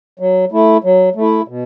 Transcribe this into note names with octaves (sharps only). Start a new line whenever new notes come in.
F#3
A3 E4
F#3
A3
E4
B2